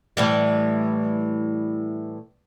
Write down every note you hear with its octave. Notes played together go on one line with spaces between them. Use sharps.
A2 E3 G3